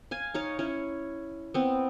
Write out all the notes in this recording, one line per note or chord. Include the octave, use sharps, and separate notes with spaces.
F5 G#5
D#4 C#5 F5
C#4 E4 C#5
B3 C4